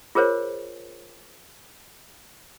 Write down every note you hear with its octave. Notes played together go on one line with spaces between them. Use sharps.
F4 G#4 A#4 C5 C#5